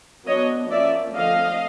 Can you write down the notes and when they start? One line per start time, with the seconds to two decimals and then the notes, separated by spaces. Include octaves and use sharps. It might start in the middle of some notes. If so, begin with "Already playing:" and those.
0.26 F#3 B3 D4 C#5 D#5
0.71 F3 A#3 C#4 D5 E5
1.15 D3 F3 A3 C4 D#5 F5